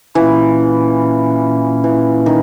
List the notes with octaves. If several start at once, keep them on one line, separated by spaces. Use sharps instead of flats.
A#2 E3 A#3 C#4 E4
E3
D#3